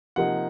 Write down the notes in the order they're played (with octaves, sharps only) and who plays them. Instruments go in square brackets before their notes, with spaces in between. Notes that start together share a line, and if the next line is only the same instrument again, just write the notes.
[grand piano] C3 F3 A#3 D#4 F#5